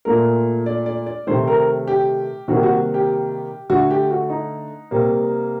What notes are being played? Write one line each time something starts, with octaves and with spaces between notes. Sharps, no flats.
A#2 A3 A#4
D5
D5
D5
C3 D#3 A3 C5
A#4
G4
C3 D#3 G3 A#3 F#4
F#4
G4
D3 A3 F#4
G4
F#4
D#4
C3 G3 A#3